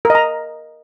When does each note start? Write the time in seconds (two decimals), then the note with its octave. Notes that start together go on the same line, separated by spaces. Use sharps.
0.05 A#4
0.10 D#5
0.15 A#5